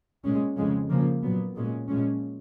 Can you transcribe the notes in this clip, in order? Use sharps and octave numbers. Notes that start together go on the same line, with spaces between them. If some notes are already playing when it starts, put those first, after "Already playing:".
A#2 G#3 C#4
F2 C#3 G#3 C#4
C#3 F3 A#3
A#2 F#3 B3
A#2 G#3 C#4
A#2 F3 G#3 C#4